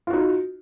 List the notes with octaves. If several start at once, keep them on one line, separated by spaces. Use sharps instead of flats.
D#4 F4 F#4